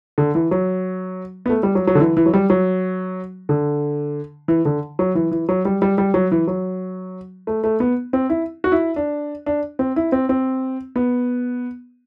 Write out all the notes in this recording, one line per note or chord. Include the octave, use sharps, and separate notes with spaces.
D3
E3
F#3
B3
A3
G3
F#3
F#3
D3
E3
E3
F#3
G3
F#3
D3
E3
D3
F#3
E3
E3
F#3
G3
G3
G3
F#3
E3
F#3
A3
A3
B3
C4
E4
F#4
E4
D4
D4
C4
E4
C4
C4
B3